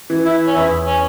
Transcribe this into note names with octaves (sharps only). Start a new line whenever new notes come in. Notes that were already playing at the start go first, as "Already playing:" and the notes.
E3
E4
C#4
E2 E4
C#4